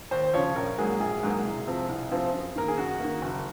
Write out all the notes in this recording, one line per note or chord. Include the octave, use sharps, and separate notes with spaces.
D#2 C5
C#3 F3 C#5
A#1 A#4
G#2 F#3 A#3 G#4
A#1 G#4
G#2 F#3 A#3
C2
C3 F3 C4
C2
C3 F3 C4
F#2
D#3 A#3 A#4
G#4
F#2 F#4
D#3 A#3
F#1